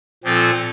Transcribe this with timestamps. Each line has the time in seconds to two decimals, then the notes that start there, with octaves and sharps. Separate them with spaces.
0.24 A#2 F3 C4 F4 A4